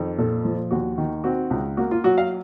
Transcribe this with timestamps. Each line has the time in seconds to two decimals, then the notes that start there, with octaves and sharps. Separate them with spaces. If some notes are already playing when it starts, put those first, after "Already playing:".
Already playing: F2 D#3
0.18 A#2 A4
0.45 F3
0.71 D#2 F#4
0.98 D#3
1.24 C4 F#4
1.51 C#2
1.77 A#3 F#4
1.91 F4
2.04 F#3 F#4
2.18 F5